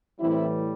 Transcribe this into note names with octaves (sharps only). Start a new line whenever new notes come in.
A2 E3 G3 C4 E4